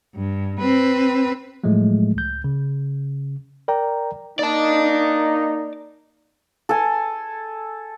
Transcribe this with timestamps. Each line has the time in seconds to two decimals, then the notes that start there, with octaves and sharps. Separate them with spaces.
0.15 G2
0.60 C4 B4
1.64 A2 F3 F#3 G#3 A3
2.15 C#2 G6
2.44 C#3
3.68 A#4 D5 G5 A#5
4.39 A#3 D#4 D5 A5
6.69 A4 G#5